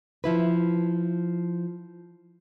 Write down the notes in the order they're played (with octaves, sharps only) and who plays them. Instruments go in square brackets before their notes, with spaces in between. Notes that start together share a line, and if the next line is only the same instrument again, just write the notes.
[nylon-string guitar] F3 E4 B4